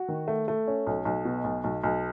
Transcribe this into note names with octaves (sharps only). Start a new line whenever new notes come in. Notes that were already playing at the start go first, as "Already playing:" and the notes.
Already playing: F#4
D#3
A3
A3
C#4
B1
B1
B2
B1
B1
B1